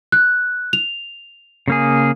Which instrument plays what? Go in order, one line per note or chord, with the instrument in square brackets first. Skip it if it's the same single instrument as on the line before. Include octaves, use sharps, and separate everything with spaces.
[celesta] F#6
F7
[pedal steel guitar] C#3 A#3 G#4